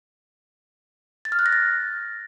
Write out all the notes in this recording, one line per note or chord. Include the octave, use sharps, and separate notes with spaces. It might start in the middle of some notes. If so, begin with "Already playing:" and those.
A6
F6
F#6
A#6
A6